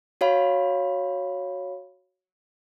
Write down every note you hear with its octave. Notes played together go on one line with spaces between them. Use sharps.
F#4 C#5 F5 B5